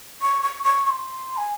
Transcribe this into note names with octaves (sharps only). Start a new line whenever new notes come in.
C#6
C#6
C#6
C#6
C6
G#5